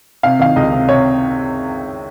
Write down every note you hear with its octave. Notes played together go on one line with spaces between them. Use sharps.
C3 F5
D#3 F5
C#2 D#5
C3
C3 C#5